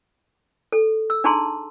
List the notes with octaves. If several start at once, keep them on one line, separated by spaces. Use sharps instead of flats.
A4
E6
D4 D#4 G#4 A5 A#5 C6